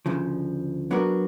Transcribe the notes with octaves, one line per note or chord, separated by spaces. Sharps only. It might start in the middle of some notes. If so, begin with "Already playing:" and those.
D2 C#3 F3
F#3 B3 D4 F#4 A#4